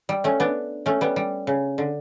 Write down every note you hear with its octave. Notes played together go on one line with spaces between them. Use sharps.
G3
A3 C#4
B3 D4
A3 C#4
G3 B3
G3
C#3
D3